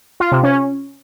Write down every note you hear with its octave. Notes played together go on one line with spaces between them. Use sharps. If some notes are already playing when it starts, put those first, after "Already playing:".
F4
C3
C#4